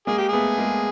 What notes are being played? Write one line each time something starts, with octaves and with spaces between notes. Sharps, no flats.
G#3 A#3 G#4
G4
A3 B3 G#4
G#3 A#3